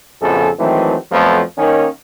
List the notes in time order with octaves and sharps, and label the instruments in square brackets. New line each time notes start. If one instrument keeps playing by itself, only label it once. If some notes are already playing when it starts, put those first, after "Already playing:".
[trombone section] A#1 F2 C#3 F#4 G#4 A4
D#3 E3 F#3 G#3 A3 C4
F2 F3 F#3 A3 B3
D#3 A#3 C#4